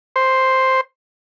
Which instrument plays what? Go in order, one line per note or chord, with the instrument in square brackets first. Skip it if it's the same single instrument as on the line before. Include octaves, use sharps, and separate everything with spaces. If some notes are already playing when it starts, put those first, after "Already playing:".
[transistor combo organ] C5